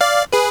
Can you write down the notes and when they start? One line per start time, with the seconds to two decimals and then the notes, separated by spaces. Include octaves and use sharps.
0.01 D5 F5
0.33 G#4 B4